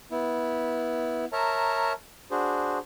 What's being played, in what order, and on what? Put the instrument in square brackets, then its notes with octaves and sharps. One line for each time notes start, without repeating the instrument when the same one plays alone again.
[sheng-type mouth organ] B3 E4
A#4 C#5 E5 A5 A#5
D4 F#4 G#4 C5